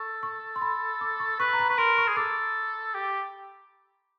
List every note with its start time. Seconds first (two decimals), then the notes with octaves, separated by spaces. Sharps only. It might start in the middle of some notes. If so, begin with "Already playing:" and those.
Already playing: A4 C#6
0.23 C#6
0.56 C6
0.62 B5
1.01 D6
1.20 C#6
1.39 B4 C#6
1.53 A#5
1.59 B5
1.69 B4 C#6
1.78 A#4 C6
1.98 C#6
2.08 G#4
2.17 A4 D6
2.94 G4